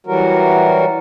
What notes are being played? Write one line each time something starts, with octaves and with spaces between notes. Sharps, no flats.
E3 F#3 G3 F#4 A#4